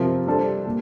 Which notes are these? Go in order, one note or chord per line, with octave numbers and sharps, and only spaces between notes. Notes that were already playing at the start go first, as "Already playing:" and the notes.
Already playing: C3 F3 C4 F4 A#4
G3 D4 A4 C5
A#2 G3